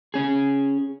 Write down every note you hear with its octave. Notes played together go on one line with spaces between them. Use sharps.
C#4 G#4